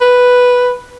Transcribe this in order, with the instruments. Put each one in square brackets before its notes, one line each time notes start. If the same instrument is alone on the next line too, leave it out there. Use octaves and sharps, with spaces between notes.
[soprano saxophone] B4